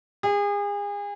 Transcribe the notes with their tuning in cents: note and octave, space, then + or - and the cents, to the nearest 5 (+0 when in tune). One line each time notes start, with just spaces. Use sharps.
G#4 -35